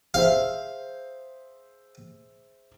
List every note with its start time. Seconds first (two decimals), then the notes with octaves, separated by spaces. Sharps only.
0.14 G#4 C5 E5 F5